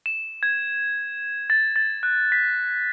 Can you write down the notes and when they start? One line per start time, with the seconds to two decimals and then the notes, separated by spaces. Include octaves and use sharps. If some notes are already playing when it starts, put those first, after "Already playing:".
0.06 E7
0.43 G#6
1.50 A6
1.76 A6
2.03 F#6
2.32 B6